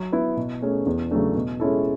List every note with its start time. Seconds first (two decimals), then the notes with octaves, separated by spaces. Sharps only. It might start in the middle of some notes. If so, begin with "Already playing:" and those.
Already playing: F#3
0.12 B3 E4
0.37 B2
0.62 A3 C#4 G#4
0.86 E2
1.11 C#3 F#3 A3 D4
1.36 B2
1.60 G#3 C#4 E4 A4